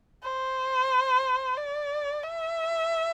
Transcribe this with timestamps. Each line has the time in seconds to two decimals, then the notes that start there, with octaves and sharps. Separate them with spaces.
0.23 C5
1.58 D5
2.24 E5